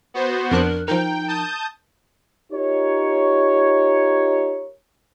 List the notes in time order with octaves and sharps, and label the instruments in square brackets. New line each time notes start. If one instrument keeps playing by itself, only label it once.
[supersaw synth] B3 F#4 C5
[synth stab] F2 D4 F#6 [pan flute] A#4
[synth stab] F3 A#4 [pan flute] D#4 [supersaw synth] G5
[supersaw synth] A5 D#6 G6
[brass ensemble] D#4 F4 G4 A#4 C#5